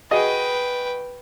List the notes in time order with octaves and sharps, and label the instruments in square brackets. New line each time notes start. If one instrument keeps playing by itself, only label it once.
[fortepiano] F#4 G#4 D#5 [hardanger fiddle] B4 G5